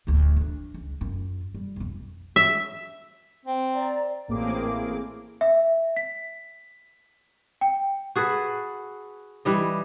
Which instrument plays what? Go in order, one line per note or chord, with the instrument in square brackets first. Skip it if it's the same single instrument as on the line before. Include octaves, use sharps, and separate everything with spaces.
[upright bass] D1 D2
F3 D4
C#2
F#2 F4
G3
B1 F2
[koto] E5
[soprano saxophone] C4
[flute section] D5 A#5
[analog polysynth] A1 A2 A#3 C4 G#4 D6
[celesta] E5
B6
G5
[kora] F#4 G#4 A4 B4
E3 G3 D#5